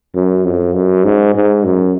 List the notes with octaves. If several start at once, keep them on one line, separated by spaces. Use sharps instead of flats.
F#2
F2
F#2
G#2
G#2
F#2